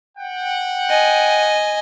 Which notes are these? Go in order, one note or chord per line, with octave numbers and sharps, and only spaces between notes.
F#5 G5
D#5 G#5